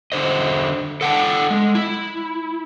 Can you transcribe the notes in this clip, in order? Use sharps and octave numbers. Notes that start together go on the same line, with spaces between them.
D3 C5 D#5
A4 F#5 G5 A5
G#3
E4